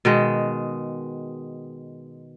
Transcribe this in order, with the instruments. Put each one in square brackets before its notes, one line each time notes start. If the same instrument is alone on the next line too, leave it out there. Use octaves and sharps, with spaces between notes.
[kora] B2 D#3 G#3